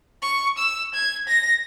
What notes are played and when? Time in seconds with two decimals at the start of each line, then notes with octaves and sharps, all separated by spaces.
0.23 C#6
0.58 E6
0.95 G#6
1.28 A#6